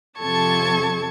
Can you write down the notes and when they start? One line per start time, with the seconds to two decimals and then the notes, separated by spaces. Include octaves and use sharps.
0.18 F2 C3 A4 A5 C#6 G#6